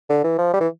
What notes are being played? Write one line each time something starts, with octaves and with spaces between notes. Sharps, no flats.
D3
E3
F3
G3
E3